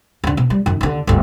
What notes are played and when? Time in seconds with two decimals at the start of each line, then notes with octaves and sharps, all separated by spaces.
0.24 D#2 D3
0.37 B2
0.50 G3
0.66 F#2 D#3
0.81 D#2 D3
1.07 G1 D2